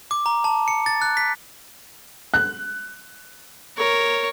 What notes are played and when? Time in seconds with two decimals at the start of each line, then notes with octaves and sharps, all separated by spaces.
0.11 D6
0.26 A#5
0.44 A5
0.68 C#7
0.86 A6
1.02 F#6
1.17 B6
2.34 F#6
3.77 A#4 C#5